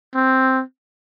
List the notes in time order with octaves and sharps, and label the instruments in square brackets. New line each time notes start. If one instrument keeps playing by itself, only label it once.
[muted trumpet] C4